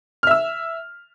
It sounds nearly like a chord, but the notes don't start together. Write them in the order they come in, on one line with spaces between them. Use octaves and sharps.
F6 E5 E6